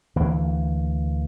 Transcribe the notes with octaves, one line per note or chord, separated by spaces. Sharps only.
D2 E3 A#3